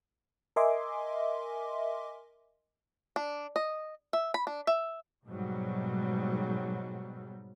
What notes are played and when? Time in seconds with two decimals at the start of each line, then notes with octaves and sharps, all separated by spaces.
0.56 A#4 D#5 E5 G#5 C6 D6
3.16 D4
3.56 D#5
4.13 E5
4.34 B5
4.47 D4
4.67 E5
5.25 G#2 B2 F#3 G3